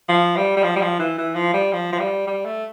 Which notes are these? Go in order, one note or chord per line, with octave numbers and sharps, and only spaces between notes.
F3
G3
G3
F3
G3
F3
E3
E3
F3
G3
F3
F3
G3
G3
A3